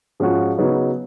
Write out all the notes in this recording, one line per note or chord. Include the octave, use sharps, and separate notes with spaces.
G#2 F3 G#3 C#4 F#4
C#3 F#3 B3 D#4